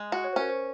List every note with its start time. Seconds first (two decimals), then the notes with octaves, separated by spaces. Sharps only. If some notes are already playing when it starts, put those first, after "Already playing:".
Already playing: G#3
0.12 F#4
0.24 C#5
0.33 C5
0.36 C#4 A#4
0.49 C5